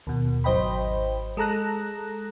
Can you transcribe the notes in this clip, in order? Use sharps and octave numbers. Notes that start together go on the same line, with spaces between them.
D#2 B2
G#1 F#3 C5 D#5 G5 B5
G#3 A4 A#5 F#6 A#6